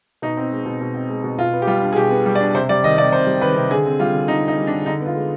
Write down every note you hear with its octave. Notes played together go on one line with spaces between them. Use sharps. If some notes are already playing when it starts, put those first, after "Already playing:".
B2 D#4
C4
G#3
B2
B2
C4
G#3
B2
B2 F4
B3
G4
G3 F4
D4
G#4
B2 G4
B3
G3
D5
D4
C3 C5
G3 D5
D#3 D#5
C3 D5
C3 C5
G3
D#3 B4
C3
D3 G#4
C4
G3 F4
D3
D3 D#4
C4 D#4
G3
D4
D3
D3 D#4
B3
F4
G#3